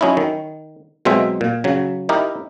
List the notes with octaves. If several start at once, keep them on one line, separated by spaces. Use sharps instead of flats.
F#3 C#4 D#4 E4
D#3
B2 F#3 G#3 C4 C5 E5
A#2
C#3 F#3
D#4 E4 G4 A#4